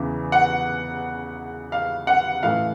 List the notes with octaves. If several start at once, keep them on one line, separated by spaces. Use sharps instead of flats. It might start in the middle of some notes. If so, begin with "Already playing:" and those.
Already playing: E2 C#3 E3
F#5
F5
F#5
A2 E3 F5